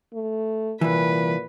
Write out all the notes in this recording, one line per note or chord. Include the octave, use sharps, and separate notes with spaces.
A3
C2 A#2 E3 B4